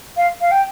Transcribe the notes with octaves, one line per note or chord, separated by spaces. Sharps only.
F5
F5
G5